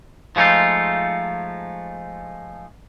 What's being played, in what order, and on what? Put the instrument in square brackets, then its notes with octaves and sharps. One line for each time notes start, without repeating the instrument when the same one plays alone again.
[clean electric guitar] F3 G#3 A3 D#4 F4